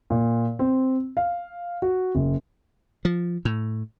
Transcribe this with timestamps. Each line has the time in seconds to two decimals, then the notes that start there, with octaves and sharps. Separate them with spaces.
0.10 A#2
0.59 C4
1.17 F5
1.82 F#4
2.15 F#1
3.05 F3
3.45 A2